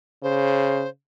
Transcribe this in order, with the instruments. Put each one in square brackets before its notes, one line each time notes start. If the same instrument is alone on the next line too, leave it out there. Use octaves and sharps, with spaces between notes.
[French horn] C#3 [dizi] C5